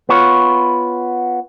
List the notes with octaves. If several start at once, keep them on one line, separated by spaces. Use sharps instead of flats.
B3 F4 C#5